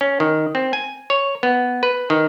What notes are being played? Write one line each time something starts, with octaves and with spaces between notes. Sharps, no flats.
C#4
D#3
C4
G#5
C#5
B3
B4
D#3